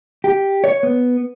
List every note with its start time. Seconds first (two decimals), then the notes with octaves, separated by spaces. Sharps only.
0.24 G4
0.64 C#5
0.83 B3